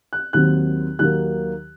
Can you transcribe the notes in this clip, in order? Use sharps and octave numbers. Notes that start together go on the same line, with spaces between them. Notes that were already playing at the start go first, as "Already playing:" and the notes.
F#6
D#2 D#3 F#3 C4 F#6
D#2 D#3 F#3 A#3 F#6